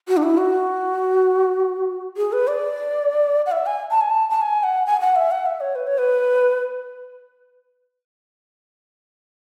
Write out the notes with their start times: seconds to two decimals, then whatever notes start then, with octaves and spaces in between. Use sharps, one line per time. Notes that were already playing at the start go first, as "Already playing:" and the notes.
0.08 F#4
0.17 D4
0.23 E4
0.38 F#4
2.17 G#4
2.33 B4
2.48 D5
3.46 F#5
3.52 E5
3.66 G#5
3.91 A5
4.01 G#5
4.10 A5
4.30 A5
4.41 G#5
4.63 F#5
4.86 G#5
5.00 F#5
5.16 E5
5.31 F#5
5.46 E5
5.61 C#5
5.75 B4
5.87 C#5
5.98 B4